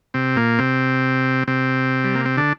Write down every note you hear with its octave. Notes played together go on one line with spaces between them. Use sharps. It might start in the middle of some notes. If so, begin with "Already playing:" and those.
C3 C4
A#2 A#3
C3 C4
C3 C4
G3
A#3
C4
D3 D4